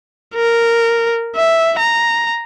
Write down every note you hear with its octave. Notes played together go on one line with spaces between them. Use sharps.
A#4
E5
A#5